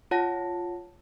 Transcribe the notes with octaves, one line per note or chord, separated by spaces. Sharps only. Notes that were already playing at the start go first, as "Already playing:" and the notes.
F4 C#5 F#5 A5 A#6